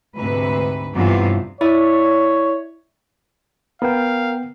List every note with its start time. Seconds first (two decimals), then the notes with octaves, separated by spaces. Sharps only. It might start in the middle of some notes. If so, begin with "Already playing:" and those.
0.16 D2 G#2 C3 B4
0.93 G2 C3 E3 F#3 B3 F4
1.61 E4 C#5 D5 E5
3.82 B3 A#4 F5 G5